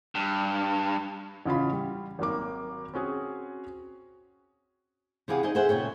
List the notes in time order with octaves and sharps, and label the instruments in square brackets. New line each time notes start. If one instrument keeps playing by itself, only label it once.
[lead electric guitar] G2
[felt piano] A1 C#3 F4 B5
G3
G#1 F#3 A#3 D6
C4 C#4 F#4 G#4
[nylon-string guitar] C3 E3 G4 G#4 F5 F#5
D#4 G#4 C5 D5 D#5
G#4 A4 C5 E5 F#5
A#2 C#3 C#5 G5